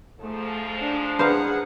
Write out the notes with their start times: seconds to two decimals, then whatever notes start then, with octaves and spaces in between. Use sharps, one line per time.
0.20 G#2 F3 A3
0.79 D4
1.19 D4 G#4 B4 C5 F5 F#5 A#5